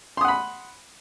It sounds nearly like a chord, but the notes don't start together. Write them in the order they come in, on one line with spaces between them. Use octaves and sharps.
C6 D#6 F#5 B5